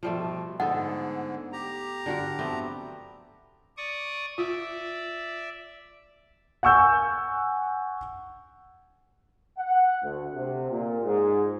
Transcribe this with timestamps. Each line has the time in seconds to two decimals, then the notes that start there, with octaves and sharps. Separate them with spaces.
0.03 B2 F3 G3 A3
0.60 G#2 D3 B3 D#4 A4 F#5
1.53 G4 A#5
2.06 D3 F#4 A#4
2.39 A3 B3 C4
3.77 D5 C#6 D#6
4.38 F4 D5 E5
6.63 F#5 G#5 C#6 E6 G6
9.58 F#5
10.03 D2
10.34 C3
10.70 A#2
11.03 G#2